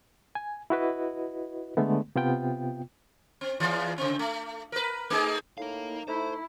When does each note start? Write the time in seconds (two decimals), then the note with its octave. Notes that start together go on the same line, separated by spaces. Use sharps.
0.35 G#5
0.70 E4 F#4 B4 D#5
1.77 D3 G#3 A3 B3
2.16 C3 B3 F4 G5
3.41 C4
3.60 E2 E3 F4
3.98 C#3 C4
4.19 A3
4.72 A#4 B4
5.10 A3 D#4 G#4
5.58 A2 D#4 A#4 F5
6.08 A3 E4 C5